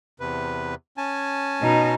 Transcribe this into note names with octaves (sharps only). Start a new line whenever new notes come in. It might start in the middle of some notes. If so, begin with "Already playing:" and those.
E2 C3 B4
C#4 G#5 A5
B2 D#4